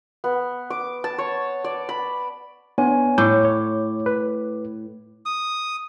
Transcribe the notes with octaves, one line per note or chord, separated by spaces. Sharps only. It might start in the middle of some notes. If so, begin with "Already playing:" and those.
B3
D6
A5
C#5
D5
B5
B3 D4 C#5 G#5
A2 C#6 D6 G6
C#5
B4
D#6